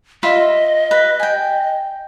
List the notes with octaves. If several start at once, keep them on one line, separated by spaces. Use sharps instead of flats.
F4 D#5 E5 B5
B4
G5 G#5